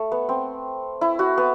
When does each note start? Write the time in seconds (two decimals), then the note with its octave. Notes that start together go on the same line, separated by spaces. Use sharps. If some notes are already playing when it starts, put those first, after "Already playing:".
Already playing: A3
0.12 B3
0.29 C4
1.01 E4
1.19 F#4
1.38 B3